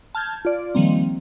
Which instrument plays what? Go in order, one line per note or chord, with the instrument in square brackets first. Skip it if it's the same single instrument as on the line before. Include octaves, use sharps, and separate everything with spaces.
[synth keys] A5 F6 G6 G#6
F4 D5
D#3 F3 G3 A#3 C4